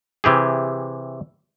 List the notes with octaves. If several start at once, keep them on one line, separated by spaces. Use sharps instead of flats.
C3 E3 G4 G#4